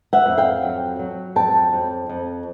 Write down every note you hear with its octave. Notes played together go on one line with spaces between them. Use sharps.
E5 F#5
F2
F5 G5
F#3
F#3
F2 G5 A5
F2
F2